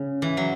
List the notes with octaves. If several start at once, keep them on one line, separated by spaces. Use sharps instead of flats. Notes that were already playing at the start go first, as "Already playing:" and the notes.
Already playing: C#3
E3
F#3